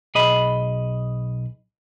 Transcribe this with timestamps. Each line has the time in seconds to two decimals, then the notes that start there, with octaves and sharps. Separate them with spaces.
0.15 B1 G#4 D#5 B5